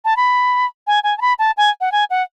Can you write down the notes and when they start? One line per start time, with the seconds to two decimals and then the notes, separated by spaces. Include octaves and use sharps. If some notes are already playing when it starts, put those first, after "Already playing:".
0.05 A5
0.17 B5
0.87 G#5
1.04 G#5
1.18 A5
1.21 B5
1.39 A5
1.57 G#5
1.81 F#5
1.92 G#5
2.10 F#5